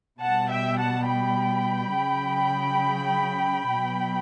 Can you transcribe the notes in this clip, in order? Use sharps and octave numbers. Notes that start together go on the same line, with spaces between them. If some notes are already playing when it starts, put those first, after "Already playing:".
B2 G3 F#5 A5
E5 G5
F#5 A5
G5 B5
C#3 F#3
B2 F#3